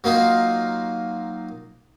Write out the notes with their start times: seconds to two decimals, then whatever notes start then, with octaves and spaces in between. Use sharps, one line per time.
0.04 F#3 A#3 D#4 F4